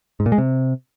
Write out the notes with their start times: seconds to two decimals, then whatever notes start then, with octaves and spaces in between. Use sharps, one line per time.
0.20 G#2
0.26 A#2
0.32 G#3
0.38 C3